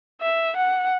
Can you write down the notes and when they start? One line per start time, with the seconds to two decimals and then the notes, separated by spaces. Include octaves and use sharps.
0.21 E5
0.57 F#5